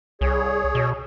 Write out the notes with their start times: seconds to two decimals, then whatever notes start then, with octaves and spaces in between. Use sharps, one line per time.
0.21 C2 G#4 C#5
0.75 B2